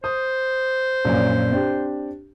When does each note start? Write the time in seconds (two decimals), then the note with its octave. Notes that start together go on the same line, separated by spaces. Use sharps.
0.04 C5 D#6
1.05 A#1 F#2 A#2
1.51 C4 D4 G4